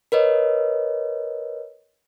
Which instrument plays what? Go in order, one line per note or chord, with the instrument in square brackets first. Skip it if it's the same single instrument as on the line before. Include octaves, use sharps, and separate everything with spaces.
[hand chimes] A#4 B4 C#5 D#5